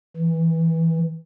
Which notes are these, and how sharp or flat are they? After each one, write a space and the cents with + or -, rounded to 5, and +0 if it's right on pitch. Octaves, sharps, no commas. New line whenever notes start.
E3 -10